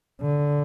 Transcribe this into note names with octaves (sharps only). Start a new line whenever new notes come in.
D3